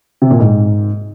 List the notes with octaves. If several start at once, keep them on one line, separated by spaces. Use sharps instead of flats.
C3
A#2
G#2